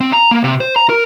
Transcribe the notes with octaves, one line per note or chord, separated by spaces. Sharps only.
C4
A#5
A#3
C3
C5
A#5
A#4